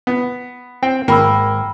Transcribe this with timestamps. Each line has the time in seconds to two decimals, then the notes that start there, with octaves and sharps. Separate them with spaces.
0.07 B3
0.83 C4 G5
1.08 G#1 A#3 G5 B5 E6